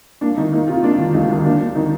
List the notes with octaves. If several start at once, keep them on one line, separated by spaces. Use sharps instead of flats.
A#3 D4
D#3 D#4
A#3 D#4
C3 F4
A#3 D4
D#3
D2 D#4
D#3
A#3 D4
A#3
D#3 D#4